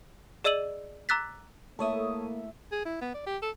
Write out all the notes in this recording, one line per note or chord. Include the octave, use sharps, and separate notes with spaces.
G#4 D5 D#5 E6 D#7 F#7
A#5 D6 E6 F#6 A6 B6
A3 A#3 E4 A4 C#5 E5 D#6
G#4
E4
B3
D5
G4
A4